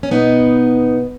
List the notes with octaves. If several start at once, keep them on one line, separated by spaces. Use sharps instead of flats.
C#4
B2 B3 D#4